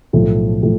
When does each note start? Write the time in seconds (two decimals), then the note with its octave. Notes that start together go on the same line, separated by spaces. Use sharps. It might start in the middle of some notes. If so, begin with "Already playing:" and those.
0.13 B1 A2 F3 A3
0.62 A2 F3 A3